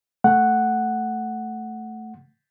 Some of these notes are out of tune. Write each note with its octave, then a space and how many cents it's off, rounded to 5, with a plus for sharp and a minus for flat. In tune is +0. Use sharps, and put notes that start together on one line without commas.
A3 +0 F#5 +0